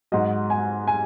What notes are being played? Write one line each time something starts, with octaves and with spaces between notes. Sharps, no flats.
G#2 F#3 D#5
G#5
G#5